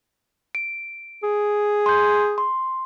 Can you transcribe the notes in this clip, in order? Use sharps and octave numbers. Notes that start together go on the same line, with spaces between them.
D7
G#4
C6 G6
C6